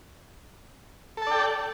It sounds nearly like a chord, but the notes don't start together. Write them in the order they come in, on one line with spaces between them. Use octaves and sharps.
A4 A5 D5 G5